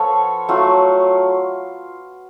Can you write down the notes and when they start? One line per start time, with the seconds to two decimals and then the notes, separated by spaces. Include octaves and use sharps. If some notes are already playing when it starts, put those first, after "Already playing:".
Already playing: F3 B3 F4 A4 C#5
0.49 F#3 A3 F4